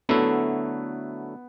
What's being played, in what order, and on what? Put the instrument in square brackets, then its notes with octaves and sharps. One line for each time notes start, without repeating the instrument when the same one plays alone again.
[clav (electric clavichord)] D3 F#3 A3 E4 [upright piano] B3